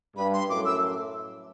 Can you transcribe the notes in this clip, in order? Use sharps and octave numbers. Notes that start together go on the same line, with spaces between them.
G2 B5
C6
F#2 A2 D6
E6